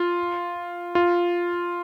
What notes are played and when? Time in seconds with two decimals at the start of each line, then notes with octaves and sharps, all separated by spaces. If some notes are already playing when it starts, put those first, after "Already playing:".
Already playing: F4
0.95 F4